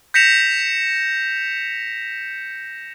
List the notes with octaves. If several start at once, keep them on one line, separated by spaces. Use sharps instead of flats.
G6 A#6 B6 C#7 E7 F7